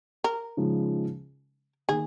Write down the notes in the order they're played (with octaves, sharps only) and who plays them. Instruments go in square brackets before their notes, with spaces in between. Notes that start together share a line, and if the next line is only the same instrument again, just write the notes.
[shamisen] A#4
[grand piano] C#3 F3 G#3 D#4
[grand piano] D#3 A#3 [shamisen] G#4